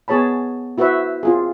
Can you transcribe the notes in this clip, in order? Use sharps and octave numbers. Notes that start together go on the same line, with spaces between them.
B3 G#4 C#5 A5 B5
E4 F#4 B4 C5 E5
C4 F4 G#4